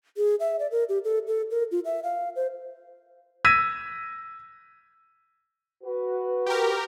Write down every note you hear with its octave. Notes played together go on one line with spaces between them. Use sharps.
G#4
E5
D5
A#4
G4
A4
A4
A#4
F4
E5
F5
C5
E6 G#6 A#6 B6 D#7
F#4 B4
G4 A#4